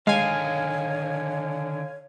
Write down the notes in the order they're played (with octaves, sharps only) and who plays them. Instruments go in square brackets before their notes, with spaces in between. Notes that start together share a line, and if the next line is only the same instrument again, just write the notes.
[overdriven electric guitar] D3 D#3 [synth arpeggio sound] G#3 [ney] C#5 [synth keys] F5 G#5